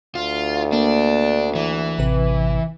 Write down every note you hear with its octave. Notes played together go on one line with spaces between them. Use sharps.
D2 F4
A#3 D4
E3
A1 C3 B4